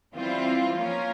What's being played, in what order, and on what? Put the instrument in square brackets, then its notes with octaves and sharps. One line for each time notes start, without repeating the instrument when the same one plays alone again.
[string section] E3 G3 C4 F4
F3 A#3 C#4 F4 A#4